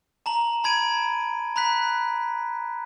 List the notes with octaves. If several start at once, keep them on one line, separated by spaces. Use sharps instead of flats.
A5 A#5 F#7
A5 B5 G#6 D7 D#7
A#5 B5 F#6 B6